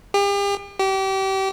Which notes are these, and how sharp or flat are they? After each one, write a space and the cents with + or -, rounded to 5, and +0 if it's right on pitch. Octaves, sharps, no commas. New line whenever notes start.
G4 +40
G4 -30